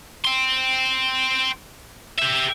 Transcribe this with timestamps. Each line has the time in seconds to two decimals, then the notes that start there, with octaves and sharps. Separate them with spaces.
0.25 G5 C6
2.19 G4 E5